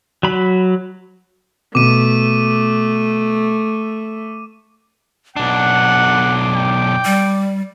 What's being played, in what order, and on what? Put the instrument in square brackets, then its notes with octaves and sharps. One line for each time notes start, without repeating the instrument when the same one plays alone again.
[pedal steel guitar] F#3 B5
[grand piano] B2 [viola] A3 [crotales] D6 D#7
[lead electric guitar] B1 D4 [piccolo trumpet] F#5 [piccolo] D6
[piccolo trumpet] G5
[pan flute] G3